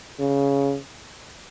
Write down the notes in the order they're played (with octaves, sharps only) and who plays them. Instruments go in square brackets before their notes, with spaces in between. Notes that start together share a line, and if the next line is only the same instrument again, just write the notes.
[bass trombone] C#3